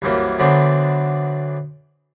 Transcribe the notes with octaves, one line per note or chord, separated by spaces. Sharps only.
C2 F#2 E3 F#3 A#3
D3 E3 F#3 B3 C4 D4